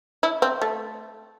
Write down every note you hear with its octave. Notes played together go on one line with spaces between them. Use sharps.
E4
C4
A3